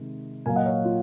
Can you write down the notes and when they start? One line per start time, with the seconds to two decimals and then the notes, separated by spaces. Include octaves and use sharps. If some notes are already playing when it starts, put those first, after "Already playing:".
Already playing: C3 D#3 G#3
0.46 A#2 F#3 A#3 F5 G#5
0.56 D#5 F#5
0.66 C#5 F5
0.84 F4